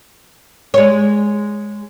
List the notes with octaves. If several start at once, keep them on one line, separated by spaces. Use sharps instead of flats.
G#3 C#5